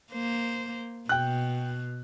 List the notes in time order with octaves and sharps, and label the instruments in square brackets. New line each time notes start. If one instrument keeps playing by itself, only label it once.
[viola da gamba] A#3 C5
[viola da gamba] B2 [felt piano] G5 F#6